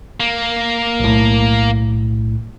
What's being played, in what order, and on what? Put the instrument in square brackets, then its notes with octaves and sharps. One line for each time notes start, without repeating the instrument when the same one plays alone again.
[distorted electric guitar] A#3
[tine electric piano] B1 A2